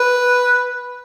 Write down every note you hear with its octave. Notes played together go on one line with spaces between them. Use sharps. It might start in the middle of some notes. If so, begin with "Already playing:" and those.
Already playing: B4